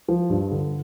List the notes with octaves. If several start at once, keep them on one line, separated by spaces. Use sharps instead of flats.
F3
G2
D3